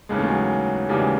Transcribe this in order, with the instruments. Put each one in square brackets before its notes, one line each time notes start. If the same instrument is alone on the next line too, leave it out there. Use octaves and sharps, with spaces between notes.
[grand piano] D#2 C#3 E3 G#3
A3
F#3 G#3
D#2 C#3 E3 G3
G#3